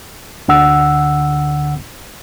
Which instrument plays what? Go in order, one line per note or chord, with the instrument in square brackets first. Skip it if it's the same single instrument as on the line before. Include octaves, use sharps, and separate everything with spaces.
[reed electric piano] D2 D3 F#5 E6